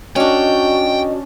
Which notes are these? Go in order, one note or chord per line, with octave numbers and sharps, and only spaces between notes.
C#4 D4 F#4 D#5 G5